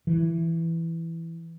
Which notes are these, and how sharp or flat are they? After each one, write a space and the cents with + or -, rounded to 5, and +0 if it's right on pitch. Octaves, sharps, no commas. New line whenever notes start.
E3 +5